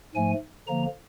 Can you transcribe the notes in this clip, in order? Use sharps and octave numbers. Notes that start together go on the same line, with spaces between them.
G#2 F3 A3 G#5
D3 F3 A#3 A#5